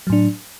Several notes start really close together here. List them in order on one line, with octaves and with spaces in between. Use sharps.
F#3 A2 D4